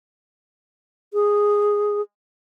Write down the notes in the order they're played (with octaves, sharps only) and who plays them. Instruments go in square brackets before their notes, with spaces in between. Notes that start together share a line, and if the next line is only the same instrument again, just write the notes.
[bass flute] G#4